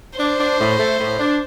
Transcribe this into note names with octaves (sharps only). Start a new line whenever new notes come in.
D4 C5
D4
A2
A3
A2
D4